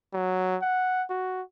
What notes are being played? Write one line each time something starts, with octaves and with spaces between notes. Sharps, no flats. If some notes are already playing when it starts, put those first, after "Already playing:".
F#3
F#5
F#4